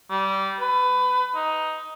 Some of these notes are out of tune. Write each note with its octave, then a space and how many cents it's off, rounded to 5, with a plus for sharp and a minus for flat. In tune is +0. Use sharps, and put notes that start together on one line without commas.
G3 -20
B4 +25
D#4 +10